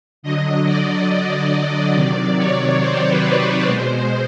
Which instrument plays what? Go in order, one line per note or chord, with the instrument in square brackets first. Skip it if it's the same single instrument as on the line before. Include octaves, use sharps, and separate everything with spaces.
[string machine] D3 F#3 D#5
D5
D#5
D5
C3 D#3 F#3 D5
C#5
C5
B4
C5
B2 G#3 C5